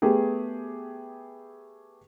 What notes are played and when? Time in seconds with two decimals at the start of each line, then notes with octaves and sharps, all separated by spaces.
0.02 A3 B3 G4 G#4